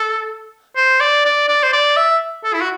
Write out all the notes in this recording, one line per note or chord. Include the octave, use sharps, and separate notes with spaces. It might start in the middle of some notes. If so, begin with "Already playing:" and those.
Already playing: A4
C5
D5
D5
D5
C5
D5
E5
A4
E4
F#4